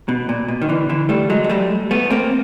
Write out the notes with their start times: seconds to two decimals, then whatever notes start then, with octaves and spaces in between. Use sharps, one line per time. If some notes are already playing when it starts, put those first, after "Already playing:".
0.09 B2
0.29 A#2
0.48 B2
0.62 D#3
0.69 D3 E3
0.89 D3 E3
1.09 G3 A3
1.30 F#3 G#3
1.44 G#3
1.49 G3 A3
1.91 A3 B3
2.10 A#3 C4